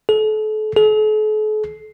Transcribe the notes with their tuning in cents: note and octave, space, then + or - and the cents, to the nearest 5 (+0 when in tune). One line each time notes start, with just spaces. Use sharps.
A4 -35
A4 -45